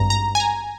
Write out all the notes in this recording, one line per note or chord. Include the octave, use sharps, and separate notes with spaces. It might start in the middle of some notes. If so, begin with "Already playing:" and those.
Already playing: G#1 G2 A#5
A#5
G#5
A#5